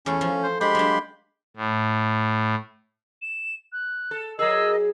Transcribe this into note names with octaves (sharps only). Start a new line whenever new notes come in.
E2 A3 C#4 A4
F3
C5
G#3 D4 G4 B5 C6
F#3 A#3 D4
A2
E7
F#6
A4
F#3 G#4 A#4 D#5 E6